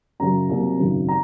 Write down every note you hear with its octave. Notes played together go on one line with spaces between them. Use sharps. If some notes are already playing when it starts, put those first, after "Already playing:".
F#2 C#3 F#3 A#5
C2 C3 F#3 A#3
G#1 F#2 C#3 F#3
A#5